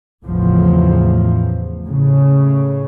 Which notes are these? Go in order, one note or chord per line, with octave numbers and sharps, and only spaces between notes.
A1 E2 C#3 F3
A2 C#3